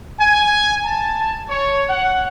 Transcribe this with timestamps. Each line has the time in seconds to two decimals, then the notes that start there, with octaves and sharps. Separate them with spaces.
0.19 G#5
0.83 A5
1.47 C#5
1.88 F#5